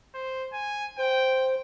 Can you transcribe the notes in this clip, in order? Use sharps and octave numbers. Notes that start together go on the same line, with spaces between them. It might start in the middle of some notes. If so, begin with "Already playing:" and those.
C5
G#5
C5 G5